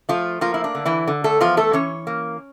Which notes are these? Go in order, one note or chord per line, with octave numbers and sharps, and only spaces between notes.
F3 A3 F4
F3 A#3 F4
E4
D4
D3
E3 E4
D3
A3 A4
E2 F3 F4
A3 A4
E3 C#4 C#5
A#3